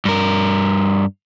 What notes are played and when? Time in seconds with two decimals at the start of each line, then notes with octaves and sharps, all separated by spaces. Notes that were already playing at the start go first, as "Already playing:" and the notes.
0.05 G2 A#4